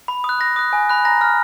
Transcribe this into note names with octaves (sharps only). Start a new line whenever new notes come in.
B5
D#6
F#6
B5 A#6
D#6 F#6
G#5
B5 F#6
A#5 A#6
F6